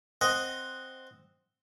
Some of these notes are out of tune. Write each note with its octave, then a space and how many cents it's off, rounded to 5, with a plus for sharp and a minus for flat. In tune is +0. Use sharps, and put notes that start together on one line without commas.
C4 +0 D#5 +0 F#5 +0